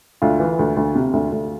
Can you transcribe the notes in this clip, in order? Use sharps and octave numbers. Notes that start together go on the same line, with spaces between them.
D2 F4
E3
D2
D2
C3
D2
D2